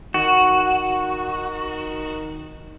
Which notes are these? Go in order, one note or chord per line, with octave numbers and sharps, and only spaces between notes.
D#3 F#4